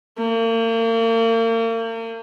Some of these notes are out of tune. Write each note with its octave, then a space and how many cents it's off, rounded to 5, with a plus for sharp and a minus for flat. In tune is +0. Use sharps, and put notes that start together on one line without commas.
A#3 -40